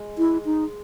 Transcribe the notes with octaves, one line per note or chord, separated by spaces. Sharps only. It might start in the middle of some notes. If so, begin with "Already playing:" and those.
Already playing: G#3
E4
D#4